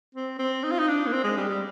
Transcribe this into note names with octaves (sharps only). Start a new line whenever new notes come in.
C4
C4
D#4
F4
D#4
D4
A#3
C4
G#3
G3
G3